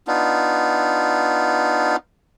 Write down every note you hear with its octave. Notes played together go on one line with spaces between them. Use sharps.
B3 D4 D#4 F4